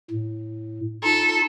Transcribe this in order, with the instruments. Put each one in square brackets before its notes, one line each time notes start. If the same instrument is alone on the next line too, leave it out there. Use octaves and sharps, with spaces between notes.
[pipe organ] A2
[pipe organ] D#4 F4 [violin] A4